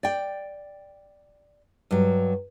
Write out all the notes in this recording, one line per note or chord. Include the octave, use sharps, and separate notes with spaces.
D5 G5
G2 F#3